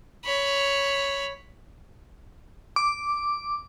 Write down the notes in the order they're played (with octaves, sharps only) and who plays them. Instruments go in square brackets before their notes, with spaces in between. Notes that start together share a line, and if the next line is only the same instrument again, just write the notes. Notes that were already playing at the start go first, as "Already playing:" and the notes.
[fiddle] C#5 B5
[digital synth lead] D6